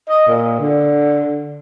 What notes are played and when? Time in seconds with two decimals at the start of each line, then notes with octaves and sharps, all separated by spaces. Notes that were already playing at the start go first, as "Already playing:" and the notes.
0.09 D#5
0.27 A#2
0.60 D3